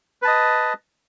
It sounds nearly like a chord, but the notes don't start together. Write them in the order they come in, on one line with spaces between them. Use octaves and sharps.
B4 A5 D#5